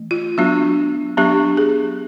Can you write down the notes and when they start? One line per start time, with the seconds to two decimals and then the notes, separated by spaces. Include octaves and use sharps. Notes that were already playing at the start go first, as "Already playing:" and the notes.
Already playing: E3 A3
0.11 F4
0.38 F#3 B3 D4 F#4
1.17 F#3 B3 D4 G4
1.57 G#4